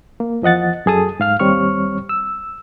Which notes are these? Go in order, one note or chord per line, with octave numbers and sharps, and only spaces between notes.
A#3
E2 F3 D#5 F#5 A6
F#2 F#3 G#4 A4 A5 D#6
G#2 F5 F6
D#2 G3 C4 C#5 C#6 F6
E6